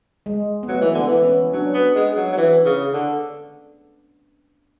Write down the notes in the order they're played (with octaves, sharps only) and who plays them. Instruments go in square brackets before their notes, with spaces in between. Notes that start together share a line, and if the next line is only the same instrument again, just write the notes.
[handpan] G#3
B3
[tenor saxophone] F#3 [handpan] A3
[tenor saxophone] E3
[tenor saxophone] D3 [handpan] B3
[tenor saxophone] E3
[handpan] C#4
[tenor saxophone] F#3 [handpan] D4
[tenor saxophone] B3
G#3
F#3
F#3
E3
C#3
D3